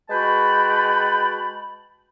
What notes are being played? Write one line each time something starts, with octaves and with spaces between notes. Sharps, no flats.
G#3 F#4 B4 G5 A5 B5